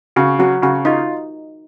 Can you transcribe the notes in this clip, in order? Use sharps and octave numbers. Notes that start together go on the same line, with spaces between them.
C#3 F#4
F#3 F#4
C#3 F#4
D#4 F4